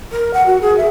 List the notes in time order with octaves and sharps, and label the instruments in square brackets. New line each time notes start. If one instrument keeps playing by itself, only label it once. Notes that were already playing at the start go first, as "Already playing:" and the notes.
[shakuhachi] A#4
F#5
F#4
G#4
E5